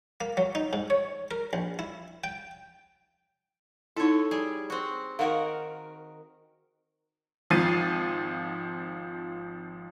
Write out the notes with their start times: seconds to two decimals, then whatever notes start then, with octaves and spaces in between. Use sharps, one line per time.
0.21 A#3
0.37 F#3
0.55 D#4
0.73 G#2
0.90 C#5
1.31 A#4
1.53 A#1
1.79 E4
2.24 G5
3.97 D#4 E4 A4 C#5
4.31 G3 G#4
4.70 C4 F#4
5.19 D#3 F#4 A#4 F5 F#5
7.50 G#1 F3 A6 C7 D#7